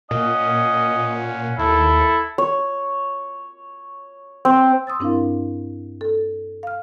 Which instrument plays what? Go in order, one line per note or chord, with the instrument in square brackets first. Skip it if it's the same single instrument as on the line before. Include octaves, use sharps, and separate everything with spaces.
[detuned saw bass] A#2 [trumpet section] C#4 F5 F#5 [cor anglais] D#5
[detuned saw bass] D#2 [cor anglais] E4 [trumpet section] A4
[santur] C#5
C4
[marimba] C6 D#6 E6 A6
G2 C4 D4 E4 A#4 F5
A4
F5 F6